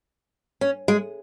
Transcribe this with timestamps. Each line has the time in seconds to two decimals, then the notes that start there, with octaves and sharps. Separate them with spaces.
0.61 C#4
0.88 G#3